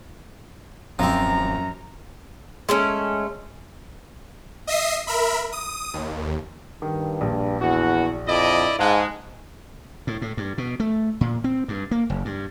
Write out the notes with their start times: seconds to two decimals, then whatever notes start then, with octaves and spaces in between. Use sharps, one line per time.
0.99 D#1 F#2 F3 C4 A#5
2.69 G#3 A3 C#4
4.67 D#5 E5 D#6 C7
5.07 A#4 E5 B5
5.52 D#6
5.94 D#2
6.82 G2 D#3
7.21 A#1
7.60 E2 F#4
8.28 F2 E4 D5 D#5
8.79 G#2 G#3 F5 A5 F#6
10.07 A2
10.22 A2
10.37 G2
10.58 B2
10.80 A3
11.21 A#2
11.44 C4
11.68 G2
11.91 A#3
12.10 F#1
12.25 G2